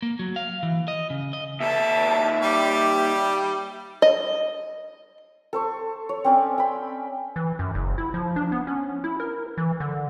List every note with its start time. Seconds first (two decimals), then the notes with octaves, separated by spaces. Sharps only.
0.02 A#3
0.19 F#3
0.36 F5
0.63 E3
0.88 D#5
1.10 C#3
1.33 D#5
1.60 D#2 A4 E5 A5
2.42 G3 G4 D5
4.02 D#5
5.53 A4 C5 C#6
6.09 C#5
6.24 C4 C#4 D5
6.58 G5 B5
7.36 E3
7.59 F#2
7.75 F#1
7.98 E4
8.14 F3
8.36 D4
8.52 B3
8.67 C#4
9.04 E4
9.20 A#4
9.58 E3
9.80 D3